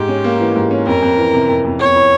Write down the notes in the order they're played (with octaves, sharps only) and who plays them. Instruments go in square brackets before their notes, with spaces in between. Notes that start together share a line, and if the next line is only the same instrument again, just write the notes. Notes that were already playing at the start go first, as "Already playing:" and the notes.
Already playing: [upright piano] G#2 [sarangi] G4
[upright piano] C#4
A#3
E3
G#2
C#4
[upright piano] F2 [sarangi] A#4
[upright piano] F2
E3
C3
F2
F2
[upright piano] E2 [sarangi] C#5
[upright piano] E4